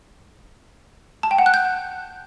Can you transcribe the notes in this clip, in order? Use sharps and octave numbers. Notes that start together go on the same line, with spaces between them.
A5
G5
F#5
F#6
G6